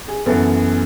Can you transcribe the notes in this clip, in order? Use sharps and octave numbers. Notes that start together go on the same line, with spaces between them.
G#4
F#2 E3 B3 A4